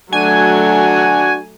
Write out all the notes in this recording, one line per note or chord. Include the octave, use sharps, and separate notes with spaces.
F#3 A3 D4 F#4 G#5